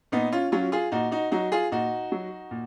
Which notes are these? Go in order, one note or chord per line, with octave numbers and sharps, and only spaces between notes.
A#2 B3 D#4
C#4 F4
F#3 C#4 F4
F4 G#4
A#2 D#4 F#4
D#4 F#4
F#3 D#4 F#4
F4 G#4
A#2 D#4 F#4
F#3
A#2